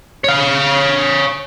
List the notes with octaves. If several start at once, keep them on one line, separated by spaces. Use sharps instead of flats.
C#5 F5